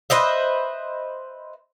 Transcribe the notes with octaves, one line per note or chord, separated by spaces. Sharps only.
B4 C5 D#5 E5